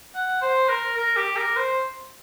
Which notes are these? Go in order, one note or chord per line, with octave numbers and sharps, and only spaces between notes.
F#5
C5
A#4
A#4
G4
A#4
C5